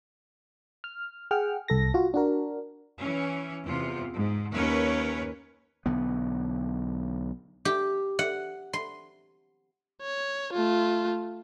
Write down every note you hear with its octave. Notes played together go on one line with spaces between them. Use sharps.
F6
G#4 F#5 G5 F6
C2 A4 A#6
F4 F#4
D4 F#4 A#4
E3 C#4
E2 C3 F4
G#2
D#2 C#4 A#4 B4 C#5
B1 D3 B3
G4
F#5
C6
C#5
A3 F4